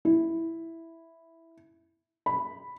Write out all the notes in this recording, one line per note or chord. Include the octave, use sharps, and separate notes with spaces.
E4
B5